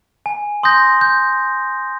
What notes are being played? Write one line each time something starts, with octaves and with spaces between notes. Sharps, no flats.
G#5
C6 D#6 G6 A#6
G6